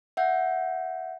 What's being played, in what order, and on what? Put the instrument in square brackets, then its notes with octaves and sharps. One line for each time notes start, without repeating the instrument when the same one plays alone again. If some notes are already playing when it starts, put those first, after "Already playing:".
[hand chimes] E5 F#5 G6